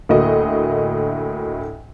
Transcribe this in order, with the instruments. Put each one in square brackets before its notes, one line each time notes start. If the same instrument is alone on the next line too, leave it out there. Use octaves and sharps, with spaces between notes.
[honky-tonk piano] D2 A2 A#3 F#4 D#5